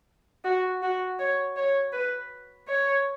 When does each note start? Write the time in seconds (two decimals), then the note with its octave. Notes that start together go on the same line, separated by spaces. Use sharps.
0.45 F#4
0.83 F#4
1.19 C#5
1.57 C#5
1.93 B4
2.68 C#5